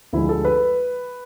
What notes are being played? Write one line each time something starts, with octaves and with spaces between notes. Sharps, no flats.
D2 D3 F3 G#3 E4
A4
B4